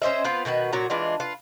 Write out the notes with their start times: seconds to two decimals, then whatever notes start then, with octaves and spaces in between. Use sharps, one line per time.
0.02 C#4 C5 D#5 E5
0.24 B3 C4 F4 B4
0.45 B2 D#3 F#4 B4
0.73 A#2 F#3 F#4 A#5
0.90 E3 G#3 D4 F4
1.20 F4 B4